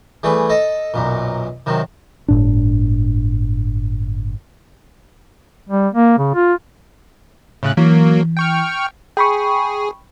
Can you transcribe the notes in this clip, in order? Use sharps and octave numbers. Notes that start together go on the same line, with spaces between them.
E3 G3 A3 G#4
A4 D#5 D#6
B1 F#2 A#2
F#2 C3 D#3
G1 A2 D4
G3
A#3
C#3
F4
A2 C#3 F#6
E3 F#3 A#3
G5 C#6 F6
G#4 G5 B5 C#6